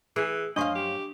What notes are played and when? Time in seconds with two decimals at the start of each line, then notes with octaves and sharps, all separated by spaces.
0.16 E3 G#4
0.56 F#2 D4 C5 D#5 F5 C#6
0.75 G4